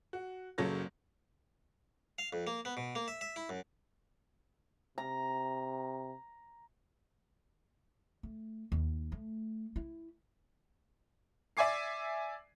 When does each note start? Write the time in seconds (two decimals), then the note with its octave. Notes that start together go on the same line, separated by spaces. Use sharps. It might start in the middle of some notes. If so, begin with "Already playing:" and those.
0.13 F#4
0.58 F#1 C#3 F#3 A4 C#5 A#6
2.18 F5
2.33 F2
2.47 A#3
2.65 B3
2.77 B2
2.95 A#3
3.08 E5
3.21 E5
3.36 E4
3.49 F#2
4.98 C3 A#5
8.23 A3
8.72 D#2
9.12 A3
9.76 E4
11.57 D5 E5 G#5 D6 C7